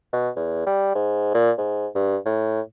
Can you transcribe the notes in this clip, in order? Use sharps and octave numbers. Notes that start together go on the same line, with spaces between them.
B2
E2
G3
G#2
A#2
G#2
G2
A2